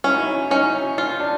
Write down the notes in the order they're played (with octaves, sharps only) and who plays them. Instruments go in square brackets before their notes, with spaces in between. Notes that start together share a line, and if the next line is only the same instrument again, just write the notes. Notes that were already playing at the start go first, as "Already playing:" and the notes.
[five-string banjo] C#4 [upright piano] E4
[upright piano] D#4
E4
[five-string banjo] C#4 [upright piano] D#4
[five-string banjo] F4
[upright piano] D4